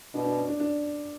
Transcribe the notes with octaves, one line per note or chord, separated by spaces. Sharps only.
B2 D4
D4
C#4
D4
D4